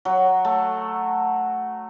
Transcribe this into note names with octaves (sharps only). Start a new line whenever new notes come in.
F#3
A3